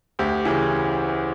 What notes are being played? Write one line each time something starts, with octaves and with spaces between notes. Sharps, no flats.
D2 G4
C#3 E3